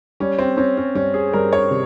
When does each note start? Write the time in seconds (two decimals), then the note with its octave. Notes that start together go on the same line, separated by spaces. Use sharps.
0.20 G3 C#4
0.39 C4
0.57 C4 C#4
0.77 C#4
0.95 G2 C#4
1.14 G#4
1.33 G2 A#4
1.53 C#5
1.71 C3